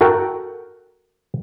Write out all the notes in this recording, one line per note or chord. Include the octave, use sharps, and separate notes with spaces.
F#4 A4 A#4 F#5 G5